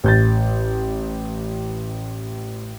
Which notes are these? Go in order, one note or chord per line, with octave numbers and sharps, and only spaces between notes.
A1 G6 A6